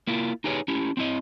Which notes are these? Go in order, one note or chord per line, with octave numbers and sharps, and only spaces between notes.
A#3 E4 F4
D#4 G4 G#4 B4 C#5
C#4 E4 G4
C4 E4 D#5